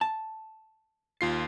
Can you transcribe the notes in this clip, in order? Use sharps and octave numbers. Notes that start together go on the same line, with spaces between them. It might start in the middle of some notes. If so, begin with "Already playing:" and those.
A5
D#2 F4 C7